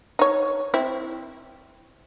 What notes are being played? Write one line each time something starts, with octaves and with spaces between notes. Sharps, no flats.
D#4 C#5
C4 E4